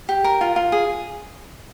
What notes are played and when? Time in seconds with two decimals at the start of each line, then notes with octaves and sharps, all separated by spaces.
0.09 G4
0.24 A#4
0.41 F4
0.56 F4
0.72 G#4